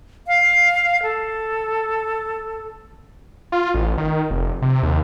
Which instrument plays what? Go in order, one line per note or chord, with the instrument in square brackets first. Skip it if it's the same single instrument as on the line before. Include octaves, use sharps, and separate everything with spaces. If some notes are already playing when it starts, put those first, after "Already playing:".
[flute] F5
A4
[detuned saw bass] F4
A1
D#3
F1
C3
D#2